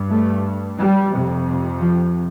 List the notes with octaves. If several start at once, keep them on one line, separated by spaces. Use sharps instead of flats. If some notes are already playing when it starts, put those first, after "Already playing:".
Already playing: G2
A3
G3
F2 C3
F3